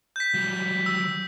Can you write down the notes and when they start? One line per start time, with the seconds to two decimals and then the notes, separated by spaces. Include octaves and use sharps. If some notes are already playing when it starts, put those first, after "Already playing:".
0.16 G6 B6
0.34 F#3 G3
0.86 E6